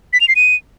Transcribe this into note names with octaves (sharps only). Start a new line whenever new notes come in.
B6
F7
C7
D#7